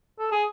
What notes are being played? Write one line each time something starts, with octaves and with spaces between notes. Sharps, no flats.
A4
G#4